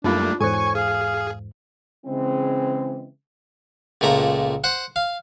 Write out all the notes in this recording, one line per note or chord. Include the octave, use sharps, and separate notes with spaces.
F#2 G3 A3 A#3 D4 D#4 F4 F5
E2 G#2 A4 C5 C#5 G#5 C#6
G#4 F5
C#3 E3 G#3 C4
C#2 A#2 A3 A#5 B5
C5 F#5
F5